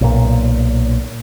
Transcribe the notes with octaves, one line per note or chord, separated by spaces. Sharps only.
B1 A#2